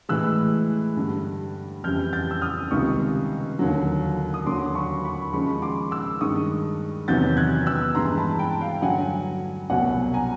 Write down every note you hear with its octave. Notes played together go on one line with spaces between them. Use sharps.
A2 E3 G#3 E6 F#6
G2 D3 G3
F2 C#3 E3 G3 F6 G6
G6 A6
E6
D#6 F6
C#2 C3 D#3 G3 C#6 D#6
D#2 D3 F#3
D#6
D#2 D3 F#3 C6 D6
B5 C#6
B5 C#6
D#2 C#3 F3 G#3 B5 C#6
C6 D6
D6 E6
G2 D#3 G#3 C#6 D#6
E2 C3 D#3 F#3 G6 A6
F#6 G#6
E6 F#6
G2 E3 G#3 A#5 C6
A5 B5
G5 A5
F5 G5
G2 D3 F#3 F#5 G#5
C2 B2 F#3 F#5 G#5
G#5 A#5